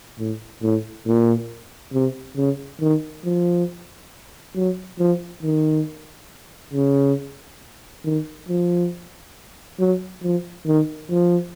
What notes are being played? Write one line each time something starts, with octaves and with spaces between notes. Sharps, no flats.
A2
A2
A#2
C3
C#3
D#3
F3
F#3
F3
D#3
C#3
D#3
F3
F#3
F3
D#3
F3